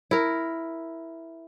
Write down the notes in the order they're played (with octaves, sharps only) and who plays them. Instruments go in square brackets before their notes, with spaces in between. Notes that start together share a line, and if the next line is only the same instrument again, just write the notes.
[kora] E4 A#4